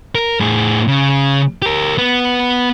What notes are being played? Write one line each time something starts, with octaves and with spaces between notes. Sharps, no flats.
A#4
A2 G#4
C#3
G4 A#4
B3